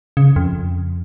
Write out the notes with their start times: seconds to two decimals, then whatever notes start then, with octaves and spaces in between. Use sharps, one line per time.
0.17 C#3
0.36 F2